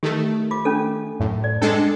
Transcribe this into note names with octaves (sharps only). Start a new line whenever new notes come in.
D#3 A3 G4
F4 D6
C#4 D4 A4
F#2 A2
D5
G#3 C#4 D4 A4 D#5